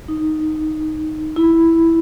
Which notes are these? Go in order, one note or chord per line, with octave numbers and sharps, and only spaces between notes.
D#4
E4